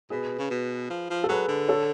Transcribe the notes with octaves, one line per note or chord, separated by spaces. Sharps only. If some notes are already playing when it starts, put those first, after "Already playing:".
B2 G#4 B4
C#3
B2
F3
F3
A4
F#3 G#4 B4
D3
A4 C#5